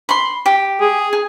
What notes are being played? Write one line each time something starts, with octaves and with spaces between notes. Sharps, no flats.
B5 C6
G4
G#4
G#4